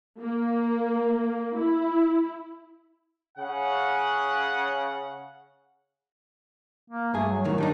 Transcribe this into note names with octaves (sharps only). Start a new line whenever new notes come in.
A#3
E4
C#3 F#5
A#3
G2 A3 G#4
F#3
F#2 A2 D#3
D#3 G3 D4 D#4